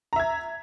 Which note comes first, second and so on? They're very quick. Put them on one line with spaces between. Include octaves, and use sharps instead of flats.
A#5 E5 G#6